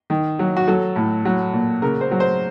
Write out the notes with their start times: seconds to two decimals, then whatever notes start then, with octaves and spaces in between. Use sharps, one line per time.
0.10 D#3
0.39 F#3
0.57 F#4
0.67 F#3 A4
0.96 A2
1.25 F#3
1.53 A#2
1.82 C#3 A#4
2.01 C5
2.11 F#3
2.20 C5